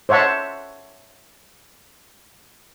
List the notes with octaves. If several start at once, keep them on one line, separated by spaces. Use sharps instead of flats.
C5 C#5 E5 F#5 A5